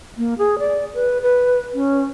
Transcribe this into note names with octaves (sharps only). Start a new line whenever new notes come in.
A#3
G#4
D5
B4
B4
C#4